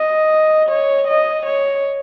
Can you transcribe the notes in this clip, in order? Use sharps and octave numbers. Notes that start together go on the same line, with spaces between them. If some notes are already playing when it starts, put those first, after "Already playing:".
Already playing: D#5
C#5
D#5
C#5